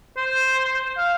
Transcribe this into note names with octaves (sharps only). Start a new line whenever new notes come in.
C5
F5